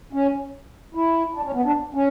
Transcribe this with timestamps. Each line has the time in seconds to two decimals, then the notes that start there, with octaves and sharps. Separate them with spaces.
0.13 C#4
0.95 E4
1.35 D4
1.44 C#4
1.54 B3
1.65 D4
1.95 C#4